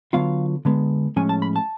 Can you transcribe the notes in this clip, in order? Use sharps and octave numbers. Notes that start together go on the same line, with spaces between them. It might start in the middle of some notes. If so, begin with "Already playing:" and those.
D3 F#3 B3 F4 F5
D3 G#3 B3
A2 F3 G#3 C#4 G#5
A5
B5
A5